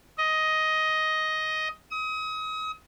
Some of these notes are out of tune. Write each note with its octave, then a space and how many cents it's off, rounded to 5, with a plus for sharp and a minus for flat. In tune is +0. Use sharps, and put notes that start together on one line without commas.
D#5 +10
D#6 +35